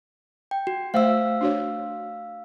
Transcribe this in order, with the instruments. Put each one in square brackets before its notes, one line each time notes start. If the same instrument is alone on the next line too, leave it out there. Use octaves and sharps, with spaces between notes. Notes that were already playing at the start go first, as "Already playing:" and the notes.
[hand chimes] G5
F#4
[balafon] A3 C5 E5 [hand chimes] F5 E6
[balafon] D4 F#4 C#5